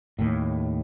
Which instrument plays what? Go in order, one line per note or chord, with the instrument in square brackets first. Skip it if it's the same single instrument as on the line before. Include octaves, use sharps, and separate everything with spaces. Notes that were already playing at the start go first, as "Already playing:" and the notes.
[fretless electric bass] D#2 A2